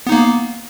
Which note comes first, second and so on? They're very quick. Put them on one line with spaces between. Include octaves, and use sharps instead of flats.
B3 D#4 A#3